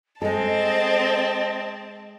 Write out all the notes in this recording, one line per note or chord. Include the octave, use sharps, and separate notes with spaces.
G#3 C4 A4 D#5 A5